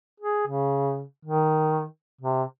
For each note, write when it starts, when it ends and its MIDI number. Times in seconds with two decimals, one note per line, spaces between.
0.20 0.42 68
0.47 1.03 49
1.25 1.85 51
2.21 2.43 48